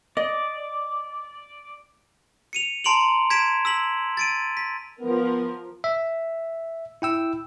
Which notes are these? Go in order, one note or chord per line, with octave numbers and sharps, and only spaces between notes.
D5 D#5
C#7 D#7 F7
A5 A#5 C6 D7 F7 F#7
G#6 B6 D7 E7
E6 B6 F#7
A6 D7 D#7
B6
F3 B3 A#4
E5
E4 G5 E6